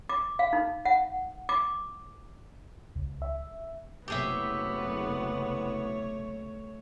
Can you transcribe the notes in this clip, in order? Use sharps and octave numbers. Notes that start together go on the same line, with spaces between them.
D6
F5
D#4
F#5
D6
C#2
E5
F#1 C3 A3 B3 G4 G#4 C#5 E5